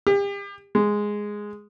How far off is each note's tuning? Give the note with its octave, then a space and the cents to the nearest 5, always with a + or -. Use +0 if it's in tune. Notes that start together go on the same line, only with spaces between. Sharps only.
G4 +35
G#3 -5